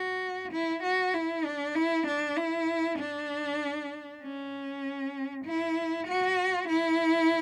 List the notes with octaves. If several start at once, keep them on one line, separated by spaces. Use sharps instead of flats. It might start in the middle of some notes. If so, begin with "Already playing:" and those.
Already playing: F#4
E4
F#4
E4
D4
E4
D4
E4
D4
C#4
E4
F#4
E4